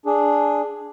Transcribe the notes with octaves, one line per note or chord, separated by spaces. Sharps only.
D4 G#4